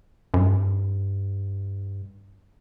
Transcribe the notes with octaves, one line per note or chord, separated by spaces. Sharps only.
F#2
G2